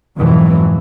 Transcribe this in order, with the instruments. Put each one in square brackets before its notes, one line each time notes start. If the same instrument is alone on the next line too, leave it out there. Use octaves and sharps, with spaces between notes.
[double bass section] F2 G#2 B2 E3 F#3